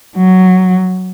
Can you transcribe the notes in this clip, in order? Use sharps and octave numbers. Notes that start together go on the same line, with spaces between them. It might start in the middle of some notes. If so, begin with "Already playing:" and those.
F#3